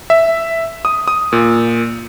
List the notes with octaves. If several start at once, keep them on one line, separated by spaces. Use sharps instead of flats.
E5
D#6
D#6
A#2